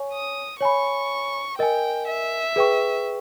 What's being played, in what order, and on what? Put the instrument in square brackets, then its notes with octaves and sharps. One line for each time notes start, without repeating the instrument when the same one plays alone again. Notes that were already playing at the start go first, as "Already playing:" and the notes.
Already playing: [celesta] C#5 G#5 C#6
[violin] D#6
[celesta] C#5 G#5 B5 [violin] C#6
[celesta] A#4 D#5 G#5 [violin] G5
[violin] E5
[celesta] G#4 B4 G5 C#6